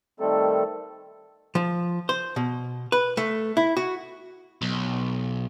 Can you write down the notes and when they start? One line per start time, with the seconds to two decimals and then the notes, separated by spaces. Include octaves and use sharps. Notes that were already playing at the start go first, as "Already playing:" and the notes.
0.20 D#3 G3 A3 C4 A4
1.55 F3
2.09 C5
2.36 B2
2.92 B4
3.17 A3
3.57 E4
3.77 F#4
4.62 B1